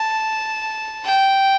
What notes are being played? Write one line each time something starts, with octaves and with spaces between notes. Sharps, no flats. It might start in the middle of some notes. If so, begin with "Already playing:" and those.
Already playing: A5
G5